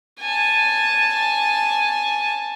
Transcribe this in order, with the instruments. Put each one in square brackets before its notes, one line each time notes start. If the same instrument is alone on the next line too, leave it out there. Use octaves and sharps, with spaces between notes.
[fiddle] G#5 A5